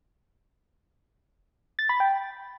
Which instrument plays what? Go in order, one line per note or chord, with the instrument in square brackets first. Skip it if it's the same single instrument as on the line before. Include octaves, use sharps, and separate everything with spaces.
[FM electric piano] A6
B5
G5